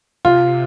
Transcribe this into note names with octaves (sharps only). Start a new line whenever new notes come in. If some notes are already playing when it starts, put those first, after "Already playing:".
C3 F4